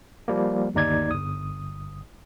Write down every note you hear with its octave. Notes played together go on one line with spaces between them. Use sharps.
F3 G3 A#3
G1 D#2 D#4 D5 G#6
G1 D#6